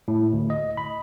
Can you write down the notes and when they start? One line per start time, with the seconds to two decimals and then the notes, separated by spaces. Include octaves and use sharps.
0.08 A2
0.33 D2
0.50 D#5
0.77 B5